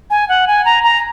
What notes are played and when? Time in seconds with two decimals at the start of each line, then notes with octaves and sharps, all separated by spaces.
0.10 G#5
0.29 F#5
0.47 G#5
0.65 A#5
0.84 A#5